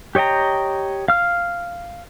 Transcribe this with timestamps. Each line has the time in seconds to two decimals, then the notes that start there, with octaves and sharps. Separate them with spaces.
0.15 G4 C#5 D#5 G5 A#5
1.08 F5 F6